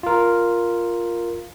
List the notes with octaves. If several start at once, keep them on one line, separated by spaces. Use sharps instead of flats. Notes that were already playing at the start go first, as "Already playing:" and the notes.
F4 A#4